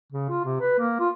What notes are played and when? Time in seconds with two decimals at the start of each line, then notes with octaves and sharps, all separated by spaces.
0.12 C#3
0.29 F4
0.45 C3
0.60 B4
0.79 A#3
1.00 F4